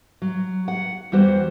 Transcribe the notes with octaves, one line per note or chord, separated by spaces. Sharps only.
F#3
F#5
E2 G3 F#4 C5